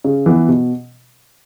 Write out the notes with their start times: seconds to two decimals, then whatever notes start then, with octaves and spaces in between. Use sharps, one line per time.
0.04 C#3
0.26 E3 B3
0.48 B2